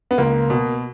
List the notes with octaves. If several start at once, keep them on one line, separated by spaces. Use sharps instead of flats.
B3
C#2 A#3
B2